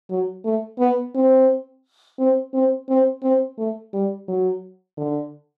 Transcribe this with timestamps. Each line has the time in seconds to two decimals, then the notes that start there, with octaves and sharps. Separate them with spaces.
0.10 F#3
0.45 A3
0.79 B3
1.15 C4
2.19 C4
2.54 C4
2.89 C4
3.23 C4
3.58 A3
3.93 G3
4.28 F#3
4.97 D3